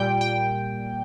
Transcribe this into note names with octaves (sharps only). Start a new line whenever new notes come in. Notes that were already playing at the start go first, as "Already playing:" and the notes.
Already playing: A#2 G3 G5
G5